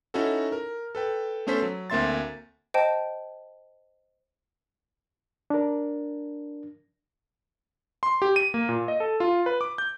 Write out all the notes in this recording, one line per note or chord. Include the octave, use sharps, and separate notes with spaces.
C#4 D#4 E4 F#4 A4
A#4
A4 B4 G5
A3 B3 C#4 A4 C5 B6
F#3
D2 A#3 C4 E5 C6 A6
C5 D#5 G5 A5
D4 A#4
C6
G4
D#7
A#3
A#2
D#5
A4
F4
B4
D6
G6